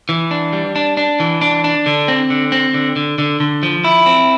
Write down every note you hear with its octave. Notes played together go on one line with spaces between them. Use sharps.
E3
D4
G3
D4
D4
E3
D4
D4
D3
C4
D3
C4
D3
D3
D3
D3
F3
E4
C4